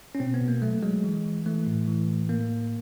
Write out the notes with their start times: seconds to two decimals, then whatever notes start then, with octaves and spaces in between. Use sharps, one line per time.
0.15 C#4
0.20 B2 C4
0.34 B3
0.41 B2
0.48 A#3
0.62 F#3 A3
0.83 F#3 G#3
1.04 E3
1.25 E3
1.46 E3 A3
1.66 A2
1.88 E3
2.09 A2
2.29 A2 A#3